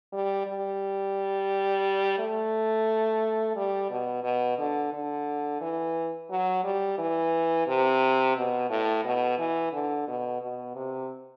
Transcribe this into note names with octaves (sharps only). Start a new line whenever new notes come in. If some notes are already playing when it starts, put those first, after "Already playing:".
G3
G3
A3
G3
B2
B2
D3
D3
E3
F#3
G3
E3
C3
B2
A2
B2
E3
D3
B2
B2
C3